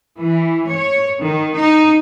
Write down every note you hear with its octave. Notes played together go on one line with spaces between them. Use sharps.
E3
C#5
D#3
D#4